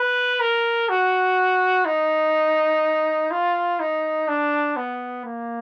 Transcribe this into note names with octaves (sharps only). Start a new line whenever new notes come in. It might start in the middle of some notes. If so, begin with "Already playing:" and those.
Already playing: B4
A#4
F#4
D#4
F4
D#4
D4
B3
A#3